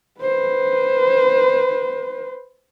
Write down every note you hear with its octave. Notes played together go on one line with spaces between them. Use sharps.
B4 C5